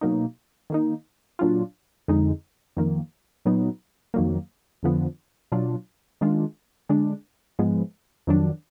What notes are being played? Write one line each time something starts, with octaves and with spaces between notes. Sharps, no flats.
B2 F#3 A#3 D#4
D#3 A#3 D#4
A#2 F#3 D4 F4
F2 D3 G#3 D#4
F2 D#3 A#3
A#2 F#3 B3 D#4
F2 D#3 F#3 A#3
F2 D3 F3 B3
B2 F#3 D4 F4
D#3 G#3 D4 F4
D3 G#3 D4
G#2 F3 G#3 B3
F2 D#3 F#3 D4